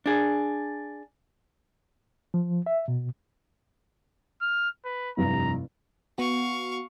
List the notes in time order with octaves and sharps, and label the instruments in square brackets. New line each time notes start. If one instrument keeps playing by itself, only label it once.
[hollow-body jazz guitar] D4 G#4
[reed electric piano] F3
E5
B2
[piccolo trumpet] F6
B4
[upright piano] F1 C2 G2 [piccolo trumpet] A#5
[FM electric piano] B3 F#4 [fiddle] F5 C#6